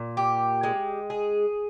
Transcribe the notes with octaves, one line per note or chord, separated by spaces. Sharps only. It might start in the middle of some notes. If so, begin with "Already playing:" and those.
Already playing: A#2
G4
G#3
G#4